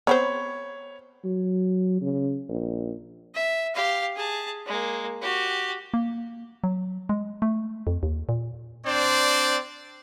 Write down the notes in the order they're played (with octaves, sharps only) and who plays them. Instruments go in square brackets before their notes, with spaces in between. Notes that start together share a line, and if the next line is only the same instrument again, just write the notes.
[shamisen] B3 C4 C5 [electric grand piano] C#5 B5
[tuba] F#3
C#3
A#1
[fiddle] E5
G4 F5
G#4 A5
G#3 A#3
F#4 G4
[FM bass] A#3
F#3
G#3
A3
F2
D#2
A#2
[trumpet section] C4 D4 C5 D5